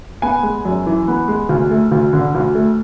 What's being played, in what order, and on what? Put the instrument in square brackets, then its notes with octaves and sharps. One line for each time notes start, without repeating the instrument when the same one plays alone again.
[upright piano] B3 G#5
G#3
F#2
E3
B3
G#3
D2
A3
D2
D3
D2
A3